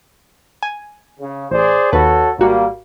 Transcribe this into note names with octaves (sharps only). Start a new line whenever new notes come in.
G#5
C#3
A1 G#4 C5 D5
D#2 F#4 A4 B4 C#5
G#1 G3 A#3 F#4